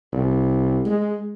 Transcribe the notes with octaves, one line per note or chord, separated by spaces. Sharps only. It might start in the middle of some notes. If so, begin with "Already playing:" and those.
C2
G#3